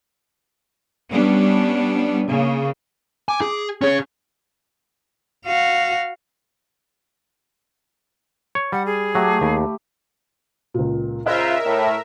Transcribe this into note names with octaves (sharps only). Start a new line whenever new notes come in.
G3 B3 C#4 D4
C#3 A#3
G#5 D6
G#4
C#4 G#4 C#5
F#4 F5
C#5
G3 F#5
G#4
F#3 A3 G4
D#2 B5
C#2 A#2
C#3 F4 A#4 C5 D#5 E5 F#6 G#6
A2